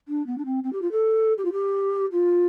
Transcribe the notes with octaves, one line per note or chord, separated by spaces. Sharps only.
D4
B3
D4
C4
C4
G4
F4
A4
G4
F4
G4
F4